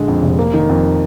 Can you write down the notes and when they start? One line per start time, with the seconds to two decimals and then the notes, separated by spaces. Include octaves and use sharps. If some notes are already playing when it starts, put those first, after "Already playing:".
Already playing: A#1 D3 G#3
0.08 F2
0.22 F1
0.39 A#3
0.54 D#3
0.69 F2